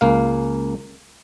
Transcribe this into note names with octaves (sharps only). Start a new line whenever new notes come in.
C#2 A#3 F5